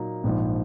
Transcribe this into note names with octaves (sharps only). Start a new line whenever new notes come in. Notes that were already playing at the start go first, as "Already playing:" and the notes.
Already playing: A#2 F#3 A#3 D#4
A#1 G#2 F3